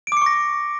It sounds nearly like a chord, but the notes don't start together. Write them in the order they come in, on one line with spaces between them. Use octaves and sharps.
D7 D6 C#7 C#6 A#6